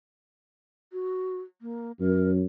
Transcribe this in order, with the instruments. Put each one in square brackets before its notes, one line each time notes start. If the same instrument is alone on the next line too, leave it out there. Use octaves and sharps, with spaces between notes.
[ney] F#4
A#3
[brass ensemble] F#2 [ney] A#4